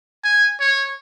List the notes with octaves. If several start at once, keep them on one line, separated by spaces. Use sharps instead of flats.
G#5
C#5